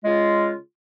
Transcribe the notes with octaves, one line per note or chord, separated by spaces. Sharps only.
C#3 G#3 F4